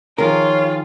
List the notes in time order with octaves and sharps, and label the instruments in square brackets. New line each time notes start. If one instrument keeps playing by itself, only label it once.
[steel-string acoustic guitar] D#3 F3 G#4 [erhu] F4 [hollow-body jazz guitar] A#4 [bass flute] C#5